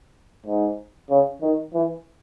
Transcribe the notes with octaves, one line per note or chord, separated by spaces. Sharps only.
G#2
C#3
D#3
E3